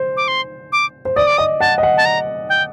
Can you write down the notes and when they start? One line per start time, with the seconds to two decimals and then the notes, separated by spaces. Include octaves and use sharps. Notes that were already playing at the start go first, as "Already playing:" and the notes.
Already playing: C5
0.17 D6
0.28 C6
0.72 D6
1.05 C5
1.16 D5 D#6
1.27 D6
1.37 D#5 D#6
1.60 F#5 A5
1.78 D#5
1.83 F#5
1.97 A5
2.06 A#5
2.49 G5